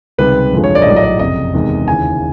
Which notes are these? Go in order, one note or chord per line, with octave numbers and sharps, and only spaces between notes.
C#2 C3 D#3 G3 B4
G#1 F#2 D3 F3 G#3
C#5
D5
D#5
A#1 A2 F#3 D5
D#5
D5
F#1 F2 C3 D#5
E2 C3 D#3 G#3
D#2 C#3 E3 G#5